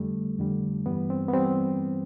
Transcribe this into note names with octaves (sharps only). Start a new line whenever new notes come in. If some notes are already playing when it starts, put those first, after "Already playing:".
Already playing: F2 D3 G3 A3
F2 D3 G3
G2 E3 G3 B3
C4
B3
E3 G3 C4